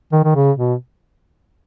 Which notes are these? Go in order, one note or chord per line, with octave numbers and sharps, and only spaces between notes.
D#3
D#3
C#3
B2